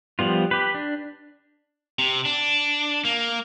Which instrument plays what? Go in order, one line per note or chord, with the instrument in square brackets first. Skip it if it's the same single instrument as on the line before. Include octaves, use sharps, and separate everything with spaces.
[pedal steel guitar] F3 G3 B3 F4
G4 B4
D4
[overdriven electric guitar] C3
D4
A#3